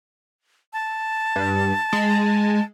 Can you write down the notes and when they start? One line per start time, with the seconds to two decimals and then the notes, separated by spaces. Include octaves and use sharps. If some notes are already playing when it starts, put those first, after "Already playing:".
0.73 A5
1.36 G2
1.93 G#3